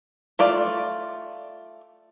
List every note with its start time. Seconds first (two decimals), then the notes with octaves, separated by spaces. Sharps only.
0.39 A3 F4 D5